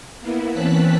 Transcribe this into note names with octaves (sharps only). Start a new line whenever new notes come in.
A#3 B3 E4
E3 C4 C#4 A5 F#6 B6